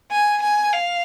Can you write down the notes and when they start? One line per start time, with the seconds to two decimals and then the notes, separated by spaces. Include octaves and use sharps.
0.12 G#5
0.42 G#5
0.73 F5